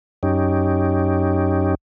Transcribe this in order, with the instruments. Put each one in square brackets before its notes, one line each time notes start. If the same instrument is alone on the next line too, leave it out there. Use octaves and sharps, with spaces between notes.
[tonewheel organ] F#2 C#4 D#4 G4